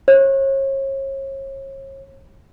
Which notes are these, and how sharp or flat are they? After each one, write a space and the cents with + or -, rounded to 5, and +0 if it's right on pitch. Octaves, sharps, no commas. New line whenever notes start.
C#5 -35